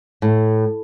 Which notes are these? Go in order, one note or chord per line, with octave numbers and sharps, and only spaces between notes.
A2